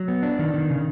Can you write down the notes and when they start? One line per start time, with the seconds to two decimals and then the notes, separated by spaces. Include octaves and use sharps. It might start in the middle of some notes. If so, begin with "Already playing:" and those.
Already playing: F#3
0.08 B3
0.23 D4
0.39 D#3
0.54 D#3
0.70 C#3